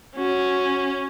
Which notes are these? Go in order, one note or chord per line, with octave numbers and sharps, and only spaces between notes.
C#4 F#4